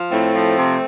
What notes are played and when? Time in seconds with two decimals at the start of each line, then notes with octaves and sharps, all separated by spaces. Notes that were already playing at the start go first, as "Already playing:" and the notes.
Already playing: F3
0.10 A2 A3 C4
0.33 F3
0.57 C3